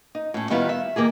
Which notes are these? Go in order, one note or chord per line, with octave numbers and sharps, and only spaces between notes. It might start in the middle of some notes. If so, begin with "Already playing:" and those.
D#4
A2 C#4
D#3 G3 B3 E4 F4 G4
E5
D#3 A#3 G4 G#4